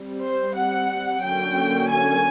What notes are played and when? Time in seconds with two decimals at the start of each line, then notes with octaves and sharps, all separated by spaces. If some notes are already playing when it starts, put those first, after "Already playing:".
Already playing: G3 C4
0.23 C5
0.56 F#5
1.23 D3 F#3 A#3 C#4 G5
1.90 G#5